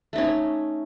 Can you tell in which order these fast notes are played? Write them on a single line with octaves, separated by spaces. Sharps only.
A3 D#4 C#4